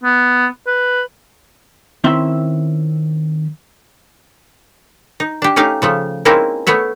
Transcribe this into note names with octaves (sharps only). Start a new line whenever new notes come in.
B3
B4
D#3 C4 C#4 E4 E5 C6
D#4
D4 G4
A3 C#4 D#4 G4 F5
C#3 F3 A3
G#3 A#3 C4 C#4 D#4 E4
A3 B3 C#5 E5